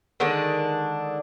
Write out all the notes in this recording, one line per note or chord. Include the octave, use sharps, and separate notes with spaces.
D3 D#3 G#3 D4